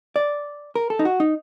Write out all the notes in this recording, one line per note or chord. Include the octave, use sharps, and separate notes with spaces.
D5
A#4
A4
D#4
F#4
D#4